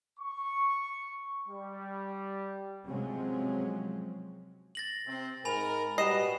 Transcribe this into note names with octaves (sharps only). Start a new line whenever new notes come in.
C#6
G3
C3 F3 F#3 G#3 C4 C#4
A6 A#6 F#7
C3 C4
G#2 A#4 G#5 B5 F7
A#2 G3 F#4 B4 D#5 C7 E7